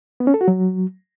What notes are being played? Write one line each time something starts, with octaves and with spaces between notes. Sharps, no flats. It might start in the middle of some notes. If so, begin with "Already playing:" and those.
B3
C#4
A4
F#4
F#3